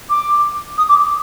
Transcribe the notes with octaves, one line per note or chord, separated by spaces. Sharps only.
D6
D#6
D6